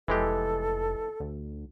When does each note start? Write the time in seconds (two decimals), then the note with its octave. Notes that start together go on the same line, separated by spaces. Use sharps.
0.08 F1 E3 G#3 G4 A4
1.20 D2